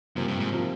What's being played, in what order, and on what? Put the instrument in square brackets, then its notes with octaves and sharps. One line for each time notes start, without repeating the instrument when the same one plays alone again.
[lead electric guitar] F#2 [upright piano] C3 F3 A#3
[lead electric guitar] G2
G#2
[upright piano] C3 F3 A#3